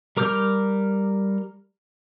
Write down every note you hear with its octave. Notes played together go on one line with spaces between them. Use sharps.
G3 A#4 D6 F6 G6